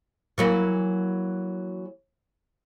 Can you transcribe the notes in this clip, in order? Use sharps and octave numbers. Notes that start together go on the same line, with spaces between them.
E3 F#3 A#3